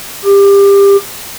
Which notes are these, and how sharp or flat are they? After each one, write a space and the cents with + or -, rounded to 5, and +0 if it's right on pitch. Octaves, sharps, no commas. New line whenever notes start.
G4 +25